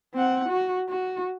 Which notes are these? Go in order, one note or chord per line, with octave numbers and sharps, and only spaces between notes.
C4 F#5
F#4
F#4